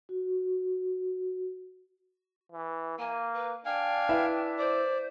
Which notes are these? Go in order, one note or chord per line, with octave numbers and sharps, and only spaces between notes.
F#4
E3
A#3 G#5
B4
D4 F5 G5 G#5
E4 B4 E5
C5 D5